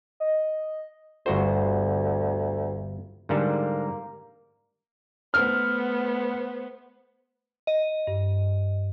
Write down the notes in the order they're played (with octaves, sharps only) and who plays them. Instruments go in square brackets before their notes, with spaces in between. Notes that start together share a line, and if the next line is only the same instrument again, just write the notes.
[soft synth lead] D#5
[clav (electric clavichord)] G1 F#4 C5 [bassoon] D2
[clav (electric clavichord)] G#2 D3 G3 [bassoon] A#3
[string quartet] A3 B3 C5 [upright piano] F6
[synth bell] D#5
[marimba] G2